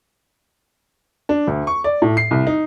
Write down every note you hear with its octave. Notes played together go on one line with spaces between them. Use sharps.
D4
D2
C#6
D5
A2
C7
C2
D#4